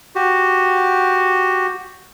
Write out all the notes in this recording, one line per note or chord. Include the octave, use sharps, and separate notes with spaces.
F#4 G4